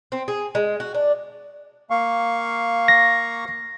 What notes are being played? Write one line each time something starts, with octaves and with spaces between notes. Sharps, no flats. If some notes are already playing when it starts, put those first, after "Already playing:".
C4
G#4
G#3
F#4
D4
A#3 F5 C#6
A#6